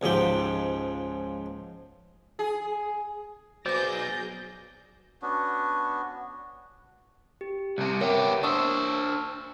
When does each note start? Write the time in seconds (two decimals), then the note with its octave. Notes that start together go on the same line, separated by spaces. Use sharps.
0.01 C#2 G#2 F3 G4
2.39 G#4
3.66 F#3 B3 G#4 C5 D5 D6 G6 A#6
5.22 B3 C#4 D4 F#4
7.41 G4
7.78 C2 C3
8.01 B3 G4 A#4 C#5 E5
8.43 D4 C5 C#6 D#6 E6